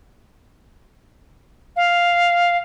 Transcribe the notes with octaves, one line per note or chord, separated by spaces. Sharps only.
F5